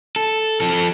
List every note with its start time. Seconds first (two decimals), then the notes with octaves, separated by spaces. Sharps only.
0.16 A4
0.60 F3 A4